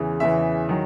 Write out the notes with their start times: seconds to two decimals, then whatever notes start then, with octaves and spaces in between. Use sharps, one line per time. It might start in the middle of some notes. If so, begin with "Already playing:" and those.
Already playing: E2 C#3 E3
0.20 E2 C#3 E3 E5
0.69 D#3 F#3